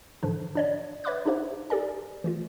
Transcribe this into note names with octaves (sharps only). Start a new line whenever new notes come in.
G#2 D3 E3 F3 D4
D4 C#5 D5
B4 C#5 E5 B5 D6 F#6
D4 D#4 G4 C5 E5
G4 A4 D5 G#5
E3 A3 F4